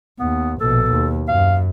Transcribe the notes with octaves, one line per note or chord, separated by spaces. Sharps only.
D#2 B3
A#1 B2 A4
D#2
F#2 F5